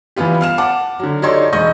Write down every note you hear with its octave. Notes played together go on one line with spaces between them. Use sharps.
E3 G3 B3 F4 G4
F5 F6 E7
F#5 A5 D6
D3 F#3
D#4 G4 A4 C#5 D5 C6
E1 D#5 C#6 G6